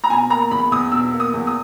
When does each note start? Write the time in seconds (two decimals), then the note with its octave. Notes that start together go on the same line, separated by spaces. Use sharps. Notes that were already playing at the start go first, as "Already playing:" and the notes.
0.04 A#5
0.10 B2 G#5
0.30 A#3 A#5
0.51 E2 B5
0.72 E2 D#6
0.92 B2 E6
1.13 A#3
1.20 D#6
1.34 E2
1.47 D#6